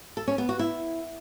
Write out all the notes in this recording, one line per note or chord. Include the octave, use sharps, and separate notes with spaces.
A4
C#4
B3
F#4
E4